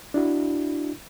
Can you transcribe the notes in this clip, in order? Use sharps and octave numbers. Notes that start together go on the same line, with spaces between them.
D4 E4 F#4